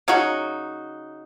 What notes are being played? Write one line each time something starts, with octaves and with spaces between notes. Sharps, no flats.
C#3 F#3 D#4 F#4